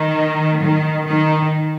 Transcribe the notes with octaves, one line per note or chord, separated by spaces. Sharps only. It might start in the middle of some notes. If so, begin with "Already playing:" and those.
Already playing: D#3
D#3
D#3